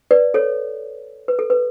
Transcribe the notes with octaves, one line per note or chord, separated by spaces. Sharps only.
B4 D5
A4 C#5
B4
A4
B4